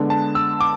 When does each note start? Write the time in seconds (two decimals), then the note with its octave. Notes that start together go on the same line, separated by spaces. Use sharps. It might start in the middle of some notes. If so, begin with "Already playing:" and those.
Already playing: D3 G#3 B3 D4
0.10 A5
0.35 E6
0.60 D6